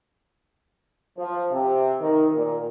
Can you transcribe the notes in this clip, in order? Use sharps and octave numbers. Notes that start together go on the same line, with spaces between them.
F3
C3
D#3
A#2